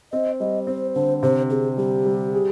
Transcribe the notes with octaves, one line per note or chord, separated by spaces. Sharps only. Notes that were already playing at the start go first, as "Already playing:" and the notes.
C4 D#5
G3 D#5
C4 C5
D3 C5
C3 C5
C4 G#4
G3 G4
G3
G#4